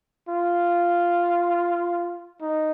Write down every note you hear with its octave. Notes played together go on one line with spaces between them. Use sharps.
F4
D#4